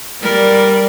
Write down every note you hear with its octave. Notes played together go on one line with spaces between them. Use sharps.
G3 A#4 D5